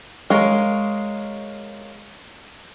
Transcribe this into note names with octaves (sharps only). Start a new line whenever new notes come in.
G#3 A#4 C#5 F5